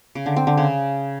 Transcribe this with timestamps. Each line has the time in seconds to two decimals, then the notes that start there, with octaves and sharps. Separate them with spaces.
0.15 C#3
0.26 D3
0.36 C4
0.47 D3
0.57 C#3